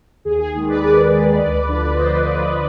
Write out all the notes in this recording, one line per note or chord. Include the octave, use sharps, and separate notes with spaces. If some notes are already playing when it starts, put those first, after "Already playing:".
D#2 G#4
G#4
D#3 G#3 G#4
B4 D5
D#2 B4 D5
D#3 G#3
D2
D3 F3
D2 C5 D#5
D3 F3